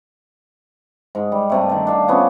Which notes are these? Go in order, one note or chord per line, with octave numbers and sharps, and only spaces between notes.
G#2
G3
G2 C3 A3
D3 D#3
D4 C5 F5
C3 B3 C#4 F4